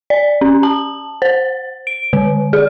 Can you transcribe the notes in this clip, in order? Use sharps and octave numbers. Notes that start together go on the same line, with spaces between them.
D5
C#4
A5
C5
D7
D3
G#4